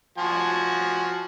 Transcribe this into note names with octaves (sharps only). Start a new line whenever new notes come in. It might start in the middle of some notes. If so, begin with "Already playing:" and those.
F3 F#4 G#5